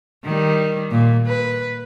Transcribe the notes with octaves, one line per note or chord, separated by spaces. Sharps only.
D#3 G3
A#2
B4